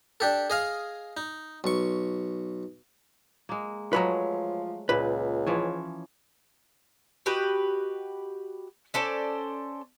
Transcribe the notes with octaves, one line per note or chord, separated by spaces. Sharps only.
D4 G4 A4
G#4 D#5 F5
D#4
B1 C#6
G#3 A#3
F3 F#3 G#3 A3 B4 C#5 A#5
C#2 A#2 B4
E3 F3 C#4
F#4 G4 B4 D#5
C#4 A4 C5 D5